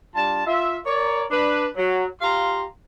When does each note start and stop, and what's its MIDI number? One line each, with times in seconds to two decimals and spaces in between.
0.15 0.43 55
0.15 0.43 62
0.15 0.43 65
0.15 0.43 81
0.46 0.77 65
0.46 0.77 76
0.86 1.24 70
0.86 1.24 73
0.86 1.24 74
1.31 1.66 62
1.31 1.66 71
1.76 2.05 54
2.21 2.64 65
2.21 2.64 67
2.21 2.64 77
2.21 2.64 82
2.21 2.64 84